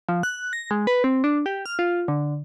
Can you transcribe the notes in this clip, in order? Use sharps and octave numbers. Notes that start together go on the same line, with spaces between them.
F3
F#6
A#6
G#3
B4
C4
D4
G4
F6
F4
D3